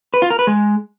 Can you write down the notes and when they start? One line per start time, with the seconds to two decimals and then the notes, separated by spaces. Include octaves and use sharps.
0.14 B4
0.22 F4
0.30 A#4
0.39 B4
0.47 G#3